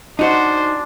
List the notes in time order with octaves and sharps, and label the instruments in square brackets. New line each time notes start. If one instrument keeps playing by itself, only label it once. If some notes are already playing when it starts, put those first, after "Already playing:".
[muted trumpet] D4 [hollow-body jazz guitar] D#4 F#4 [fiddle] C5